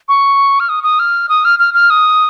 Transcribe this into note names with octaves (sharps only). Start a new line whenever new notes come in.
C#6
F6
D#6
D#6
F6
D#6
F6
F6
F6
D#6